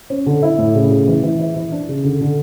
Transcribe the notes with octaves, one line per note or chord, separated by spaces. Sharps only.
C#4
D3
E4
A2
C#3
C#3
E3
E3
E4
E3
D4
C#3
D3
D3